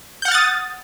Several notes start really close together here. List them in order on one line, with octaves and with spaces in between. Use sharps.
G6 F#5 F6 A6 D#6